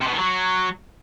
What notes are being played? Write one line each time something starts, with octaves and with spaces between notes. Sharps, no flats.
C3
B2
D#3
F#3